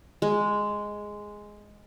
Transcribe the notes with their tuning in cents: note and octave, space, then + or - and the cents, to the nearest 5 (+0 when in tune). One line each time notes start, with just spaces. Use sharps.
G#3 +0